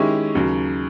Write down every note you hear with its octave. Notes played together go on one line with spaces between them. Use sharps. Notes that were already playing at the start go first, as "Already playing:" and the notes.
Already playing: D#3 G#3 C#4 E4 G4
D#2 C#3 F#3